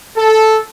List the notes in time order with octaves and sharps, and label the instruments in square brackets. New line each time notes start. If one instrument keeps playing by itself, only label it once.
[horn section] A4